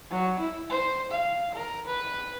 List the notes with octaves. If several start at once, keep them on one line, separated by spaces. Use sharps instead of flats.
F#3
E4
C5
F5
A#4
B4